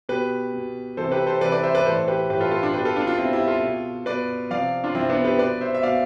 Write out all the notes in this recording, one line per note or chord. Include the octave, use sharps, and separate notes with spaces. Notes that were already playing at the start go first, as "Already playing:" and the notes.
B2 G4 B4
B2
C3 E3 A4 C5
G4 B4
A4 C5
C3 E3 B4 D5
B4 D5
C5 E5
B4 D5
A2 E3 A4 C5
G4 B4
A2 E3 G4 B4
F4 A4
F4 A4
D4 F4
B2 G4 B4
F4 A4
D4 F4
D4 F4
B2 C4 E4
E4 G4
F4 A4
B2
B2 B4 D5
C3 F3 D5 F5
D4 F4
C3 F3 C4 E4
B3 D4
G4 B4
B2 B4 D5
C5 E5
E5
B2 D5 F5